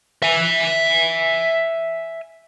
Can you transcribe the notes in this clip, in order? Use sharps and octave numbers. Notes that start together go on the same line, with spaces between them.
E5 G#5